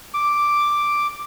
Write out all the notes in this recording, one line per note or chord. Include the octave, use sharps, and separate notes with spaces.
D6